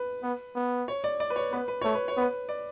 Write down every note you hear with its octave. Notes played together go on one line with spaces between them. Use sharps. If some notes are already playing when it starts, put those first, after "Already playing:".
Already playing: B4
B3
B3
C#5
D5
D5
B4
C#5
B3 B4
B4
A3 C#5
B4
C#5
B3
B4
D5